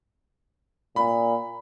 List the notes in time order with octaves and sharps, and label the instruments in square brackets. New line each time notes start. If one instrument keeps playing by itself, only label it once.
[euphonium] A#2 [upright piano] B5